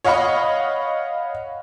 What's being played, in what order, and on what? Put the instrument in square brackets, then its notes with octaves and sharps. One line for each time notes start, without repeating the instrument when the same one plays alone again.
[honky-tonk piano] C#5 D#5 F5 F#5 B5 C#6